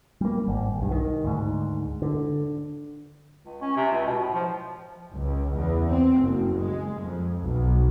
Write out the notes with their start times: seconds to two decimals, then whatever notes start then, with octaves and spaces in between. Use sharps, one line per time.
0.21 G3 A#3
0.48 G#1
0.78 B1 G2
0.91 D#3
1.24 D2 G#2
2.02 D3
3.45 C#2
3.61 C#4
3.77 C3
3.92 C#2
4.06 B2
4.19 A2
4.34 F3
5.11 C#2
5.57 E2
5.91 C4
6.21 F#1
6.59 G#3
7.01 F2
7.40 B1